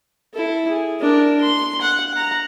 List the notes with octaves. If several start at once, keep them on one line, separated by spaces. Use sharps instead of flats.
E4 A4
G#4
D4 A#4
C6
F#5
F#5 A#5